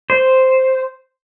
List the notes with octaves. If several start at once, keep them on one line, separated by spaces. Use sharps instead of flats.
C5